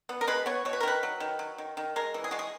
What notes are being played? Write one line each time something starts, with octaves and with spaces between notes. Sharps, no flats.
B3
A#4
G#3 B4
B3 C#5
B2 C#5
B4
A#4
D#3 B4
F#3
D#3
F#3
D#3
D#3
G#3 A#4
E3
G#4
G#3 F#4
G#4